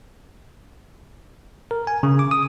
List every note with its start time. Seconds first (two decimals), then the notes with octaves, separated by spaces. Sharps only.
1.71 A#4
1.87 G#5
2.03 C#3
2.19 D6
2.31 D#6